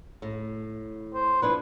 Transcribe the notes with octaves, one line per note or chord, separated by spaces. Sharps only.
A2
C5
F3 D4 E4 B4